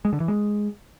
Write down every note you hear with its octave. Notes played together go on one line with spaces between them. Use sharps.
G#3
D3
E3
G#3